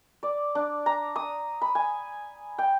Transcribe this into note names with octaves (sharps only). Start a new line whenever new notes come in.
D5
D4
A#5
D#6
B5
G#5
G5